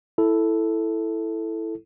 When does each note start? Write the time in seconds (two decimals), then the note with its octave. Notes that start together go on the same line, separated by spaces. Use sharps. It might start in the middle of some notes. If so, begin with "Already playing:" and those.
0.18 E4 A4